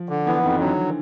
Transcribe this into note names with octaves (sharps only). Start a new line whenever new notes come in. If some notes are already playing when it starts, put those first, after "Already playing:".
Already playing: F3
D3
E3 B3
F2 D#3
D3 F#3